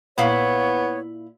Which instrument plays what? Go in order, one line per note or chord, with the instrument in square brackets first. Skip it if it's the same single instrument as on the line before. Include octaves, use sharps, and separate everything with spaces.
[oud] A#2 E4 F5 [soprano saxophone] B3 [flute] C#5